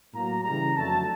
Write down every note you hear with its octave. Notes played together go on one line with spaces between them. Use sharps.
A2 F#3 A#3 A#5
C#3 E3 G3 A#5
F2 D3 F#3 A3 A5